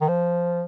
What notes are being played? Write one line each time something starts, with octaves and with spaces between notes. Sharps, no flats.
D#3
F3